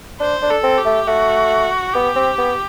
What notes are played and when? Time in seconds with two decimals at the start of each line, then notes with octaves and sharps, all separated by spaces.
0.20 D4 C5
0.42 D4
0.50 A4
0.63 C4
0.78 G4
0.85 A3
1.07 A3 F#4
1.94 B3 G4
2.16 C4
2.38 B3